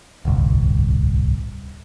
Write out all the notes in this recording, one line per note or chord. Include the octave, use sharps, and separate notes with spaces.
D1 G1 C2